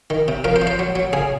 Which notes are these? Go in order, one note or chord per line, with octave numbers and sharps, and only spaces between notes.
D#3
C3
F3 A#4
C5
F3
C5
F#3
F#3
C#3 G#4